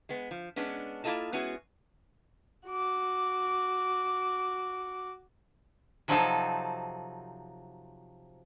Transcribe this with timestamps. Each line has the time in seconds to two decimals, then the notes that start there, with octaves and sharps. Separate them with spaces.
0.09 G#3 B3
0.31 F3
0.56 G#3 B3 C#4 D4
1.04 A#3 E4 F4 A4 D#5 A5
1.33 G#3 B3 C#4 E4 F#4 G#4
2.68 F#4 D6
6.08 C3 F3 F#3 C4 D#4 A4